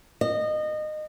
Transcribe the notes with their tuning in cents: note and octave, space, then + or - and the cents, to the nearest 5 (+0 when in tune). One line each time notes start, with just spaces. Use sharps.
D#5 -25